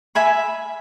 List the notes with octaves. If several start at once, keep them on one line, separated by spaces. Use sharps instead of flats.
E5 G#5 B5